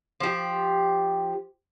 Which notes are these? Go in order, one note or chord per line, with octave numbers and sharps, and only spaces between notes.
F3 G4